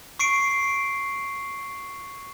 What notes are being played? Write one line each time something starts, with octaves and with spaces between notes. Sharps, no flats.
C#6 C7 D7